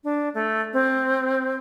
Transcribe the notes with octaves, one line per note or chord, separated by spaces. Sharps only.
D4
A3
C4